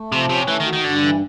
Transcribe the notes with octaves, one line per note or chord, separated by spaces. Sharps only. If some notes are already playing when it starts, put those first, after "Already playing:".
Already playing: A3
C3 F3
C3 C#4
E3 A3
D#3
F#4
D#3
G2 D3
E3